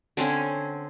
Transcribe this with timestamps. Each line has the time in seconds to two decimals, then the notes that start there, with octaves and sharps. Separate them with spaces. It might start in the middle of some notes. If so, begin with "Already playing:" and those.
0.17 D3 C4 C#4